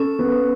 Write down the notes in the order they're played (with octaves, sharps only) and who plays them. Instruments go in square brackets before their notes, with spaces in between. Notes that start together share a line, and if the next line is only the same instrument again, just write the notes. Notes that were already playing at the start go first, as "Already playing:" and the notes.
Already playing: [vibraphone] C#4 [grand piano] A4
[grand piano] B3